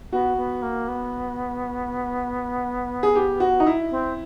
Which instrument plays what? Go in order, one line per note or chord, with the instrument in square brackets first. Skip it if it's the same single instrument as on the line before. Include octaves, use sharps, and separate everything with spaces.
[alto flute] B3 [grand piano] F#4
[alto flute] B3
A#3
B3
[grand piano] G#4
G4
F#4
D#4
E4
[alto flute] C4